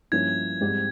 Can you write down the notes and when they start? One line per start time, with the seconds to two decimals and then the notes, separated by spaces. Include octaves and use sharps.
0.12 G2 F3 A#3 C#4 E4 G#6
0.61 G#2 G3 C4 G4